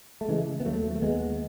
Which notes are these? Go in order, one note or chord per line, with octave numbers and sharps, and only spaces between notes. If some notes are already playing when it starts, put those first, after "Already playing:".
A3
C#3 E3 G#3
B3
D#2 F#3 A3
A3
D#2 G#3 B3